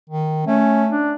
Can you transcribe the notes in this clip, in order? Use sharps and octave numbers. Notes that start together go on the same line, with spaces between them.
D#3
A3 C#4
D4